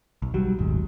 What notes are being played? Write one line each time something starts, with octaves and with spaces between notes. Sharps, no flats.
B1
B1 F#3 G3
D#1 G#1 G#2